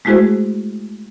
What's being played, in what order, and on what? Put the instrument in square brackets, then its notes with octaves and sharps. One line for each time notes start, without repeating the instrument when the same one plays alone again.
[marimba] G#3 A3 E4 F#4 G#4 C5